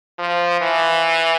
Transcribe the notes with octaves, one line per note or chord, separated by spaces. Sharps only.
F3
E3